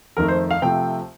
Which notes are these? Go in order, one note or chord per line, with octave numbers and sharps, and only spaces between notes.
F2 D#3 A3 A#4
C5
F5
C3 F3 A3 G5